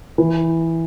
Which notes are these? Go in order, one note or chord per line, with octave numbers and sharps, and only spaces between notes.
E3